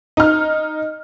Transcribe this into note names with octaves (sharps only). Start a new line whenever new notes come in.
D#4 F6